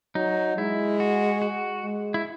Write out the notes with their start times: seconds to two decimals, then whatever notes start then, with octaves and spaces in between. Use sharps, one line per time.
0.15 F#3 D#4
0.57 G#3 E4
1.00 F#4
1.42 F#4
1.83 G#3
2.14 E4